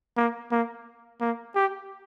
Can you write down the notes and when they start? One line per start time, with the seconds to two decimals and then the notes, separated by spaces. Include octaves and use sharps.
0.17 A#3
0.51 A#3
1.21 A#3
1.55 G4